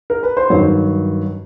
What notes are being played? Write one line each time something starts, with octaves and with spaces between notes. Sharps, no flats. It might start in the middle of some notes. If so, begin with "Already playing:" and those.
A#4
B4
C5
G2 D#3 F#3 C#5